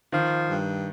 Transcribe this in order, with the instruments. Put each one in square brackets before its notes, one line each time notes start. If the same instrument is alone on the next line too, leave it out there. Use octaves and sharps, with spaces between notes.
[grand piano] D#3 [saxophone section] F3
[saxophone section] G2